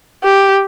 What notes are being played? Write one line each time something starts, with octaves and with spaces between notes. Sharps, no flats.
G4